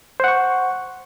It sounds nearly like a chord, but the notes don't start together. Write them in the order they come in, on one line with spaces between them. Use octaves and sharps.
C5 F#5 C#6